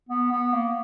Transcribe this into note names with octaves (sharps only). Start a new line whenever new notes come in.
B3
B3
A#3